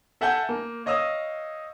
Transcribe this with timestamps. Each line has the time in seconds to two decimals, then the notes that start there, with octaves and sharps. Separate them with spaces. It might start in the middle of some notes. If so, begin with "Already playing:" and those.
0.21 A4 E5 F#5 G#5 A5 G6
0.49 A#3
0.86 C#5 D#5 F5 D#6 E6